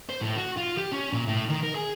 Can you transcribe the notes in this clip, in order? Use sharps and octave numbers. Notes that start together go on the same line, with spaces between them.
C5
A2
F#4
F4
G4
C#4
A#2
A2
D#3
A#4
G#4